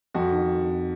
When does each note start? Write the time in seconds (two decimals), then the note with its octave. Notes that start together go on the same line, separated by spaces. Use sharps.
0.14 F2 F#4
0.32 D#3